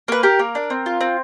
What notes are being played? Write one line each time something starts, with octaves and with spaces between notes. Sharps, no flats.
A#3 B4
G4 A#4
A#3
D4
C4
F4
C4